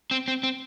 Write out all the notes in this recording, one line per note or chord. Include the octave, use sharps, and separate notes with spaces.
C4
C4
C4